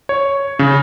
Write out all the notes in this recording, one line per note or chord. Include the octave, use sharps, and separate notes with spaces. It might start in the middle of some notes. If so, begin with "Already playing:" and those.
C#5
C#3